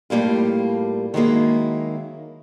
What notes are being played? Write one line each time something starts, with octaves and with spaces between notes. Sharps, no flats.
A2 G3 A#3 F4
D#3 F#3 G#3 A#3 E4